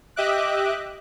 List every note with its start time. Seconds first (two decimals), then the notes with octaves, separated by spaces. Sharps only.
0.16 G4 D#5 E5 D6 F#6